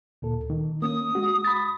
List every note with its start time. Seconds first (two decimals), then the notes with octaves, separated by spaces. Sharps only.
0.22 D2 A#2 A4
0.50 D#3
0.82 A#3 C#4 D#6
1.15 G#3 F#4
1.44 B5 A6